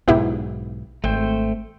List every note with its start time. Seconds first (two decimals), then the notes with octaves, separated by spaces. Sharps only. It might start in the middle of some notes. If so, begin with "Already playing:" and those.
0.08 B1 G#2 B2 B3 E4 G4
1.04 G#1 A3 C5 G5